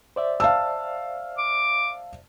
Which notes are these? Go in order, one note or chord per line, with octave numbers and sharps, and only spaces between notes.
C5 D5 E5
F5 A5 E6
D6